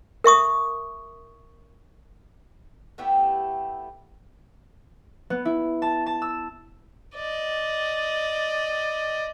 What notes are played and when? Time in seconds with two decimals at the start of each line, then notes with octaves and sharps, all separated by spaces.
0.24 A#4 E5 C#6 D#6
2.98 A3 B3 E4 G4
5.30 B3
5.45 E4
5.82 A5
6.06 A5
6.22 E6
7.16 D5 D#5